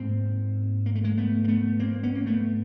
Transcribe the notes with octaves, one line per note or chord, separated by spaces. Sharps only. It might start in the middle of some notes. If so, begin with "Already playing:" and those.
Already playing: G#2 A#3 C4
A#3
A3
G#3 A#3
A3 B3
A#3
A3 B3
A#3 C4
B3 C#4
A#3
A3 B3